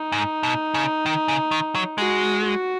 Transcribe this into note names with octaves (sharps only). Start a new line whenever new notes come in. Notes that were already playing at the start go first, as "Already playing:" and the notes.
Already playing: D#4
G#2
B2
C#3
D#3
C#3
D#3
F#3
G#3 F#4
F#4